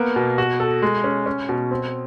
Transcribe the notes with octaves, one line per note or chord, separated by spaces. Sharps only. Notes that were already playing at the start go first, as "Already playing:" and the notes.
Already playing: A#3 B3
B2
F#4
A4
G#3
C#4
C#4
B2
C4